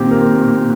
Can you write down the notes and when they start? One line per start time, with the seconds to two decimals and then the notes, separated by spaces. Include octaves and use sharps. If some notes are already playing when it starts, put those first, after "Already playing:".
Already playing: A#2 D#3 C4 G4
0.11 A#4